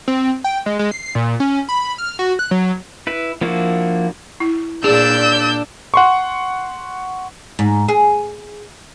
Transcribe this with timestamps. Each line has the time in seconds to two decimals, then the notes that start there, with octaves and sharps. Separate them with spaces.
0.08 C4
0.44 G5
0.66 G#3
0.79 G#3
0.91 C7
1.15 A#2
1.40 C#4
1.69 B5
1.98 F6
2.19 F#4
2.39 F#6
2.51 F#3
3.07 E4 B4
3.41 F3 A#3 D4 E4 F#4
4.40 E4
4.84 A#2 D4 G#4 D5 E6 G6
5.94 F#5 C6 C#6
7.59 G#2
7.88 G#4